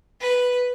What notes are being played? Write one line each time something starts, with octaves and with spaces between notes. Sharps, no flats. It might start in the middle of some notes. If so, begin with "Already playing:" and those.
B4